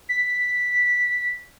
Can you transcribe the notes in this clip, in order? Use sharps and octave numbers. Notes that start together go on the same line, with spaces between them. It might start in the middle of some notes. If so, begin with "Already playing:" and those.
B6